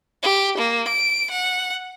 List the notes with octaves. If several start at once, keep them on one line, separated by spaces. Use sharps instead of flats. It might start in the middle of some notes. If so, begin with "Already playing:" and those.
G4
A#3
D7
F#5